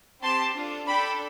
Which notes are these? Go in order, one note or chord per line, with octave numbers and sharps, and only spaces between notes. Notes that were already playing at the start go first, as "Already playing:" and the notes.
C4 G4 A5 C6
D4 F4 A4
D4 A4 G5 B5